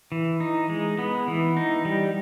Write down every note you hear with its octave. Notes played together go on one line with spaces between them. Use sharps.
E3
D#4
G#3
B3
E3
D#4
G3